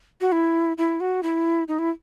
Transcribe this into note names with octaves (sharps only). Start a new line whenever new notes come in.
F#4
E4
E4
F#4
E4
D#4
E4